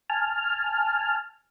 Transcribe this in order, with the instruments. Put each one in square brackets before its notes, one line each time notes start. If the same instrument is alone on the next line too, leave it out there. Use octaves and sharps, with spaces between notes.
[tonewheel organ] G#5 A5 F6